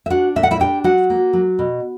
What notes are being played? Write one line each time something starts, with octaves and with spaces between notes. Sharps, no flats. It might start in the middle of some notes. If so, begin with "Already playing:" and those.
E5
D4 F#4 F#5
A#2 E5
F#5
E4 E5
D4 G4 G5
F#3 F#4 F#5
A#3
F#3
B2